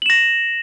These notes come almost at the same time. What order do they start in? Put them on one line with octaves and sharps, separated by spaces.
F#7 E7 A#6